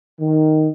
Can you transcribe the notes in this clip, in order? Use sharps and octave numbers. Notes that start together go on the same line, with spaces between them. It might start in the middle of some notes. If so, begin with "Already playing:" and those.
D#3